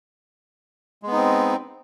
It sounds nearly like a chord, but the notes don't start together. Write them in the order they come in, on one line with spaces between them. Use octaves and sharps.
G#3 B3 D#4 C4